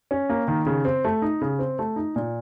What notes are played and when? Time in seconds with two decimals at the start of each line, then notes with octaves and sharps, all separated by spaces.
0.11 C#4
0.30 A#3
0.48 D#3
0.66 C#3
0.85 C4
1.04 A3
1.22 D#4
1.42 C#3
1.59 C4
1.79 A3
1.96 D#4
2.16 A#2